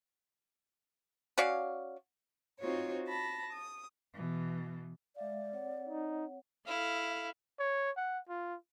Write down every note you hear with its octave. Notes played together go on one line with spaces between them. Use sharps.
C#4 F#4 D5 F5
C4 D#4 F4 F#4 C5 C#5
A5 B5 A#6
D#6
B2 E3
G#3 D5 E5 F5
C4 C#5 F#5
D#4
E4 A4 F5
C#5
F#5
F4